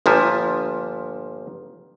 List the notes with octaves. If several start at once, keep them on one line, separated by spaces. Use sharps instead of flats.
G1 A#2 F3 E5